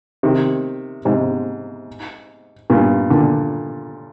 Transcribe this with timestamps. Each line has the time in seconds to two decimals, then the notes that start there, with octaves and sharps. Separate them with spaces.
0.23 C3 D#3
1.05 G#2 C3
2.70 G2 A#2
3.10 A#2 D3